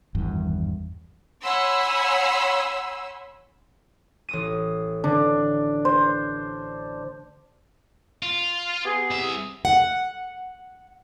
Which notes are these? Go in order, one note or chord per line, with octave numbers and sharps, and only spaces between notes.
G#1 E2 G2
C#5 F#5 G#5 B5 C6 E6
A1 D#6 D#7
D3 D4
C5
F4
B3 G4 G#4
C2 E5
F#5